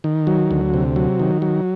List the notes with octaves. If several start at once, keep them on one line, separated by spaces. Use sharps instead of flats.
D#3
F#3
D2
C3
F#3
D#3
F#3